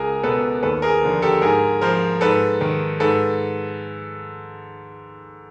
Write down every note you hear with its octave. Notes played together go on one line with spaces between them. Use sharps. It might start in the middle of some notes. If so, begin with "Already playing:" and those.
Already playing: C#2 G#4 A#4
B2 A4 B4
D#2 A4 B4
G#4 A#4
D3 F3
G4 A4
G#2 G#4 A#4
F3 A#4 C5
G#2 A4 B4
D#3
G#2 A4 B4